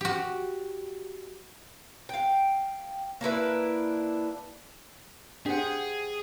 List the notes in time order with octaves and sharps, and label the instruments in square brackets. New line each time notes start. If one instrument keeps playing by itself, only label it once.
[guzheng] F#4 G4
[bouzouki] F5 G5
A#3 D4 E4 B4
[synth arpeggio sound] D4 [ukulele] G4 C5 F#5 [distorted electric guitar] G#4